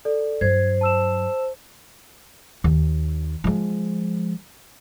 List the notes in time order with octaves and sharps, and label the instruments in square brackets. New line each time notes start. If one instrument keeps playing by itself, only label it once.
[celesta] A4 D5
[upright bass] G2 F#3 [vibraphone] C5 [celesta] G#6
[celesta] A5 E6 E7
[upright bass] D#2
F3 G#3